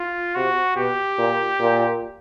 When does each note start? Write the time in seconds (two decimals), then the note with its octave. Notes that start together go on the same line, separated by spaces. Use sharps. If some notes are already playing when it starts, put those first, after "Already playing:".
Already playing: F4
0.35 C3 F#4
0.76 B2 G4
1.18 A#2
1.60 A#2